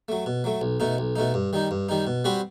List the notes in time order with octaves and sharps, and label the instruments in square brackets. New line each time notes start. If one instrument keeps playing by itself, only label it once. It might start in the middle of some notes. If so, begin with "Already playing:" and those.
[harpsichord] F#3 A3
B2
F#3 A3
B1
B2 A3 D#4
B1
B2 A3 D#4
G2
D#3 G3 D#4
G2
D#3 G3 D#4
B2
G3 C4 F#4 B4